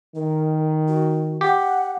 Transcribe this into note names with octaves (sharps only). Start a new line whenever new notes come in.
D#3 A#4
F#4
G4 F#5